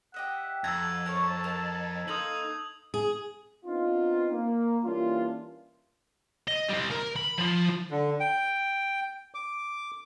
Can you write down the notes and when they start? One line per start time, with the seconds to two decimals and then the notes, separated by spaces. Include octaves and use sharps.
0.14 G4 D#5 E5 F#5
0.64 F2 F#5 A5 A#5 E6 G#6
1.06 A#4 C#5 C#6
1.44 A#4
2.08 A#3 D#4 A4 C5 D#6 G#6 F#7
2.94 G#4
3.65 B3 C4 D4 D#4 F4
4.32 A#3
4.84 E3 G3 A#3 C#4 D4 F4
6.47 D#5
6.69 G3 C4
6.91 A#4
7.16 B5
7.38 F3 F4
7.91 D3
8.20 G5
9.35 D6